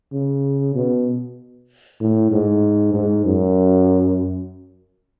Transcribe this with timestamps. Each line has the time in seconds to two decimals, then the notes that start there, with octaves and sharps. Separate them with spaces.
0.13 C#3
0.75 B2
2.00 A2
2.31 G#2
2.94 G#2
3.25 F#2